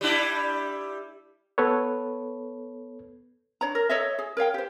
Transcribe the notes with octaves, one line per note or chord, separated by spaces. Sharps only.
G3 D4 E4
B3 A4 B4 C#5
D4 C#5 A#5
A#4
A4 C#5 D#5 E5
G#4
A#4 C#5 F5 G5
G4 C5